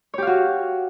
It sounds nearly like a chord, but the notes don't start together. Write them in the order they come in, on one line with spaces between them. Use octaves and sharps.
C#5 G4 F5 F#4